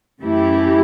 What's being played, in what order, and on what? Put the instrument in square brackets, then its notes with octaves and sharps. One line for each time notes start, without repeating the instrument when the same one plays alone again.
[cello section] F#2 E3 A3 E4 G4